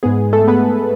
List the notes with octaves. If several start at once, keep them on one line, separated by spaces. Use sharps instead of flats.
G#2 G#3 B3 G#4
A3 A4
B3 B4